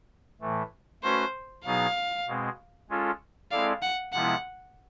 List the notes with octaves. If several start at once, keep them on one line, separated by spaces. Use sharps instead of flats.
A2 E3 A3
A3 C#4 F#4 B4 C5
B2 F#3 B3 D#4 G#4 F5
B2 G#3 C4
G#3 C#4 F4 A4
G#3 C4 E4 A4 D5 F5
F#5
C3 F3 G#3 B3 E4 F#5